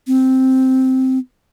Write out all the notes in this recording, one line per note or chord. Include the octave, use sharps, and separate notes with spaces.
C4